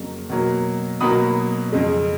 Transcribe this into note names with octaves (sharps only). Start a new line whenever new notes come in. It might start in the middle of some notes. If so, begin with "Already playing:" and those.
Already playing: F2 C#3 F#3 A#3
B2 F#3 A#3
B2 F#3 A#3 B5 D#6
F2 C#3 G#3